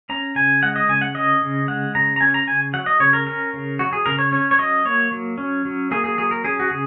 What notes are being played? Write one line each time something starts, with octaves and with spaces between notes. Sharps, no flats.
C#4 A#5
C#3 G#5
G#3 F#5
D#5
C#3 G#5
F#5
C#4 D#5
C#3
G#3 F#5
C#3 A#5
A#5
C#4 G#5
A#5
C#3 G#5
F#3 F#5
D#5
C#3 C#5
A#4
C#4 A#4
C#3
F#3 F#4
G#4
C#3 A#4
C#5
C#4 C#5
C#5
F#3 D#5
A#3 C#5
F#3
C#4
F#3
A#3 G#4
G#4
F#3 G#4
A#4
C#4 G#4
F#4
C#3 G#4